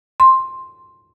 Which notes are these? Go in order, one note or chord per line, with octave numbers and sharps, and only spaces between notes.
C6